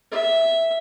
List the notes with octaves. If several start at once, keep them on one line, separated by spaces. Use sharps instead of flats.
E5